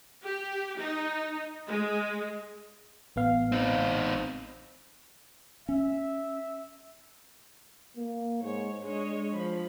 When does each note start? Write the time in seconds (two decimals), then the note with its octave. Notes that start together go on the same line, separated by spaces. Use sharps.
0.24 G4
0.78 D#4
1.68 G#3
3.16 A1 B3 F5
3.52 C4 D#4
5.69 C#4 E5
7.97 A#3
8.43 G#2 C#5
8.84 G#3 D4 C#5 D#5
9.33 F3 B5